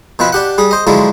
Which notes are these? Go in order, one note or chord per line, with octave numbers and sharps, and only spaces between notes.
B2 F3 C4 B4
D4 G4 F#5
G3 G#4
C5 D#5
D3 F3 F#3 G#3 E4